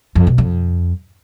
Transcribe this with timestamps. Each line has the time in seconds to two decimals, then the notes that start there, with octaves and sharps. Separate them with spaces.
0.15 F2
0.27 B2
0.38 F2